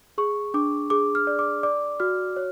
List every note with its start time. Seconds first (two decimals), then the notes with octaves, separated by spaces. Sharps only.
0.18 G#4 C#6
0.54 D4 D6
0.90 G#4 D6
1.15 F6
1.27 D5
1.39 D6
1.63 D5 D6
2.00 F#4 F6
2.36 C#5